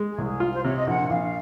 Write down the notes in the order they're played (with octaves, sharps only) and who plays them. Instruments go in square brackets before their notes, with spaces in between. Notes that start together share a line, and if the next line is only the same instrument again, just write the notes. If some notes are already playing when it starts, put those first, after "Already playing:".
Already playing: [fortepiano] G#3
[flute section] G#4
[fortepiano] C2
[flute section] G#4
[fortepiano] F4
[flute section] C5
[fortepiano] C3 [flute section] C#5
[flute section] D#5
[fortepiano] A#1 [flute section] F#5
[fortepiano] A#1 [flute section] F5